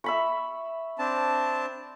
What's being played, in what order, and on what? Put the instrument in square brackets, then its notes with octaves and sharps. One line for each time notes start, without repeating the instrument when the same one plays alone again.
[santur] E5 B5 C#6
[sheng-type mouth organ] C4 D4 A5